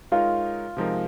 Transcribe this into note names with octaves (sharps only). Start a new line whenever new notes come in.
G#3 D#4 F4 A#4 C#5
C3 F3 G#3 D#4 A#4